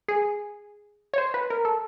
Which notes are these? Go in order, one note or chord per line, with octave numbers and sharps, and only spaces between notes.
G#4
C#5
C5
B4
A#4
A4